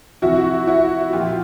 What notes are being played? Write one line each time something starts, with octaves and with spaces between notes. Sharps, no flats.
C3 F3 E4 F#4
E4 F#4
A#2 F3 F4 G4